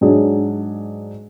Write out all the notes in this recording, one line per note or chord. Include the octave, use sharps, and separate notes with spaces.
G#2 F#3 D4 G#4